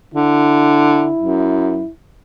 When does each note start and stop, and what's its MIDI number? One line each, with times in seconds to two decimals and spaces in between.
0.14 1.11 50
0.14 1.88 64
1.19 1.83 42